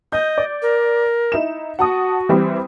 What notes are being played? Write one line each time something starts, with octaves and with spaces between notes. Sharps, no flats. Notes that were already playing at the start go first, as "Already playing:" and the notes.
D#5 G6
D5
A#4
D#4 E4 E7
F#4 F#5 A5 D#6
E3 G3 C4